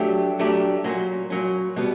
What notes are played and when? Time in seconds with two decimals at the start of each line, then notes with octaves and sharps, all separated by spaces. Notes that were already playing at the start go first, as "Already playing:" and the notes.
Already playing: F#3 A3 D4 G4
0.39 F#3 A3 D4 G4
0.84 A#2 F#3 A#3 C#4
1.30 A#2 F#3 A#3 C#4
1.76 B2 G3 B3